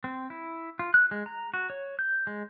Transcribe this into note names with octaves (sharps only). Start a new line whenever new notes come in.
C4
E4
F4
F#6
G#3
A#5
F#4
C#5
G6
G#3